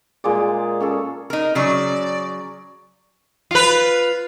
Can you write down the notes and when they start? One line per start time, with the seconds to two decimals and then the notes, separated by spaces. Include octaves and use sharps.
0.24 A#2 G#3 G#4 D5
0.80 C#4 G#4 A4
1.30 D#4 A#4
1.55 C#3 F#3 D5
3.51 F4 B4